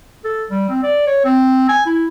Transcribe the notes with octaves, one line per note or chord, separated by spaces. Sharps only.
A4
G3
C4
D5
C#5
C4
G#5
E4